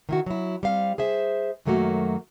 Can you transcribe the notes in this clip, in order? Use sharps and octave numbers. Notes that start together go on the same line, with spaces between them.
D#3 E4 F#4
F#3 E4
G3 C4 F5
G#4 C5 E5
F#2 D#3 F#3 A3 A#3 F#4